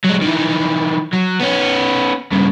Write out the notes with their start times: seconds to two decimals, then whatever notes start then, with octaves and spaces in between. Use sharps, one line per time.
0.04 F#3 G#3
0.21 D#3 E3
1.13 F#3
1.40 B3 C#4
2.32 G2 C#3